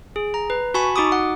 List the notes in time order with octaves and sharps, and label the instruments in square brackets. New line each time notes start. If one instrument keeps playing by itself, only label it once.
[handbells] G#4
A#5
B4
F#4 G#5 A5 B5 C#6
D#4 F#4 D6 D#6
F#5